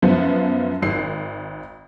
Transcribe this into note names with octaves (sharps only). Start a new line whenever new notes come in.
F#2 F3 B3
G#1 C7